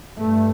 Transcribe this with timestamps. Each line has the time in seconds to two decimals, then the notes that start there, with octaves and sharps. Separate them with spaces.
0.19 G2 A3